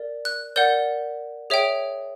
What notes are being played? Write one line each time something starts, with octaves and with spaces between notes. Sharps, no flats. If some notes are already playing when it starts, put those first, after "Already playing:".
Already playing: A#4 D5
F#6
A#4 D5 F#5 G6
G#4 C#5 E5 G5